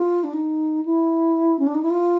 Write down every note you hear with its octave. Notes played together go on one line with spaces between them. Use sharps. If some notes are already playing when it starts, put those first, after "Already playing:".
Already playing: F4
D4
D#4
E4
C#4
D4
D#4
E4
F4